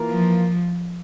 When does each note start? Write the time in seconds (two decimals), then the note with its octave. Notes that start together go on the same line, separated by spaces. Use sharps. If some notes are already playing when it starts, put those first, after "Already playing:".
Already playing: E3 A#3 F4 A#4
0.11 F3